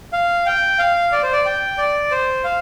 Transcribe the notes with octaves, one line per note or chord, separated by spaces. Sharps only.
F5
G5
F5
D5
C5
D5
G5
D5
C5
F5